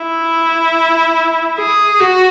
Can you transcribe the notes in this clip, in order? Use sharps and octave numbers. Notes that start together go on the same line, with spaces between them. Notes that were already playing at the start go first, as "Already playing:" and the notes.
Already playing: E4
G#4
F#4